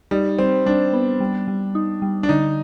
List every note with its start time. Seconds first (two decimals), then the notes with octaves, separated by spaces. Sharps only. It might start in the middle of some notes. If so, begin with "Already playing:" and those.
0.11 G3 D#4
0.38 G3 C4
0.66 G3 D4
0.93 B3
1.20 G3
1.48 G3
1.75 D#4
2.02 G3
2.23 D4
2.29 D3 D#4